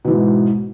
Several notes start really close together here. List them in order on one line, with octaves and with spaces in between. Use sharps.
B2 E3 G#2